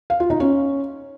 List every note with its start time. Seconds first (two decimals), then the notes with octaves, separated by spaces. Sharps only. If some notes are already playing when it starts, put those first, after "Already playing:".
0.10 F5
0.20 F4
0.30 D#4
0.40 C#4